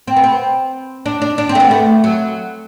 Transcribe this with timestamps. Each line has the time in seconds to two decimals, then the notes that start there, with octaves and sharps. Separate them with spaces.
0.07 C4
0.16 B3
0.24 C4
1.06 D4
1.22 D4
1.38 D4
1.49 C4
1.55 A3
1.60 B3
1.71 A3
2.04 F#3